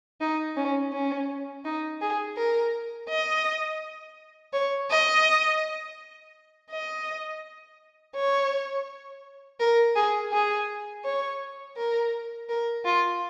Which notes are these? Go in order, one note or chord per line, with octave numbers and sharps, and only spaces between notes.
D#4
C#4
C#4
D#4
G#4
A#4
D#5
C#5
D#5
D#5
C#5
A#4
G#4
G#4
C#5
A#4
A#4
F4